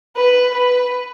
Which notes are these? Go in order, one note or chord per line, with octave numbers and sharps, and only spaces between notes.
B4
B4